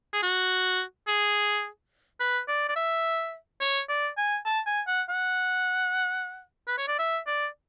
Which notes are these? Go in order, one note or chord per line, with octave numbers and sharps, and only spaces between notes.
G#4
F#4
G#4
B4
D5
D5
E5
C#5
D5
G#5
A5
G#5
F#5
F#5
B4
C#5
D5
E5
D5